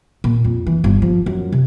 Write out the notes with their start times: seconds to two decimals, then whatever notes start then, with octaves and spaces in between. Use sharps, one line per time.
0.24 A#2
0.44 F2
0.66 E3
0.84 G1
1.02 F3
1.26 F#2
1.52 C3